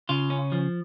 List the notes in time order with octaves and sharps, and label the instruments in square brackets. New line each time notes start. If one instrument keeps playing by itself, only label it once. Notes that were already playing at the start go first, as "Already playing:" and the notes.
[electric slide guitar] C#3 [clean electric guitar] F4
[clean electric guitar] C#4
F3